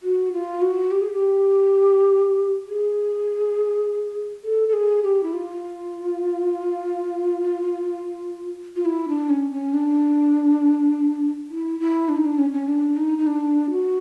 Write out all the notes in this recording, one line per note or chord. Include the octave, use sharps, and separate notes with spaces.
F#4
F4
F#4
G4
G#4
G4
G#4
A4
A4
G#4
G4
E4
F4
F4
E4
D4
C#4
C#4
D4
E4
E4
D4
D#4
D4
C#4
C#4
D4
D#4
D#4
D4
F#4